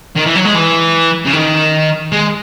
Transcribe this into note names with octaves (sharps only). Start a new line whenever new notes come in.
D#3
E3
F#3
G#3
E3
C#3
D#3
G#3